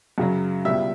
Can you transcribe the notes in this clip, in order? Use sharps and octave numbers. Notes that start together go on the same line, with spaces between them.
F#2 C#3 F#3
C#2 B2 G3 E5